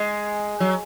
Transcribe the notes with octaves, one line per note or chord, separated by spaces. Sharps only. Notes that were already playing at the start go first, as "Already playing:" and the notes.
Already playing: G#3
F#3